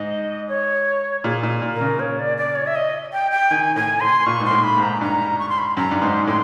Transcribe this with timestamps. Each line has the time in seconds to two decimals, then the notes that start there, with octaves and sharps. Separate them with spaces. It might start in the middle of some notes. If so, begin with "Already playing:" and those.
Already playing: G#2 D#5
0.49 C#5
1.24 A#2 G#4
1.43 A#2
1.62 A#2
1.74 A#4
1.81 C#3
2.00 C#5
2.19 D5
2.37 D5
2.56 C#5
2.67 E5
2.75 D#5
3.13 G5
3.31 G5
3.51 D#3 G#5
3.76 A2 G#5
4.00 A2 C6
4.26 A#2 C#6
4.40 G#2 C6
4.51 A2
4.64 B5
4.77 G#2
4.83 A#5
5.01 G2 A#5
5.39 C#6
5.49 C6
5.58 B5
5.67 C6
5.77 F#2 A#5
5.91 G2
6.01 G#2 C6
6.27 A2 C6